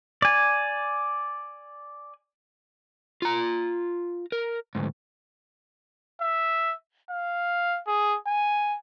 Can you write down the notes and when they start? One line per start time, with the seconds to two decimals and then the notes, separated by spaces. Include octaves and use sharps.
0.22 D5 G#5
3.22 F4 A#5
4.32 A#4
4.75 D2 G#2
6.21 E5
7.10 F5
7.87 G#4
8.27 G#5